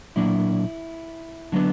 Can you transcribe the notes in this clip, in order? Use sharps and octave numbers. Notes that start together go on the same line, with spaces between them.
A#2 F#3 A#3 D4 E4
D3 F#3 B3 D4